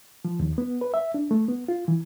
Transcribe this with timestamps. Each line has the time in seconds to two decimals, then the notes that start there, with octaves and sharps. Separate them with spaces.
0.25 F3
0.40 D#2
0.58 B3
0.81 B4
0.94 E5
1.14 D4
1.31 A3
1.48 B3
1.68 F4
1.88 E3